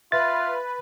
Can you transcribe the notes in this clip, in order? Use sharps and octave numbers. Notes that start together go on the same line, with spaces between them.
F4 B4 E5 A6